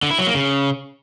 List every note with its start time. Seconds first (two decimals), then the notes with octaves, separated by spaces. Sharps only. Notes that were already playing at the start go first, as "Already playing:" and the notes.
0.03 D3
0.11 E4
0.19 F#3
0.27 A#3
0.35 C#3